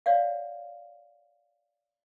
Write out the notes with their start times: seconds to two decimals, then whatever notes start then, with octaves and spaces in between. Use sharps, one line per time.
0.06 C#5 D5 F5 F#5